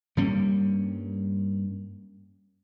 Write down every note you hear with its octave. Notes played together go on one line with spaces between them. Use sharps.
G2 G3 A#3 C#4